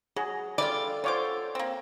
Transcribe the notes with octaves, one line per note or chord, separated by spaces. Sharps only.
F#3 G#4
G3 F4 A4 D5
D3 F4 C5 C#5 D6
A#3 C4